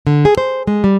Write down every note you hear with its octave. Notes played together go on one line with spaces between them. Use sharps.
D3
G#4
C5
G#3
G3